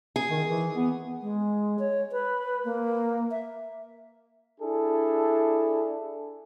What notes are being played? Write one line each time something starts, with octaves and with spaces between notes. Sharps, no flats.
G#4
D#3
E3
B3
G#3
C#5
B4
A#3
E5
D4 E4 G#4 A4